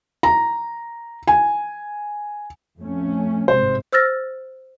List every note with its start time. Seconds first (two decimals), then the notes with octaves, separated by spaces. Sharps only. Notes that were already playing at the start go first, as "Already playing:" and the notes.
0.23 A#5
1.27 G#5
2.79 F2 A3 C#4
3.48 A1 G#2 C3 C5
3.93 C5 E6 F6 A6 A#6